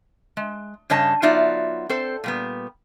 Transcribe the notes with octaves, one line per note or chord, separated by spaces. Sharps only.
G#3
G2 C#3 G3 C#5 D#5 A5
F#3 B3 D#4 F4 D5 E5
C4 A4 C5
A#2 G3 B3